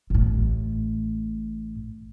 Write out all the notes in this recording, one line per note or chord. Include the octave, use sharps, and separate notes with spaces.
A1 A2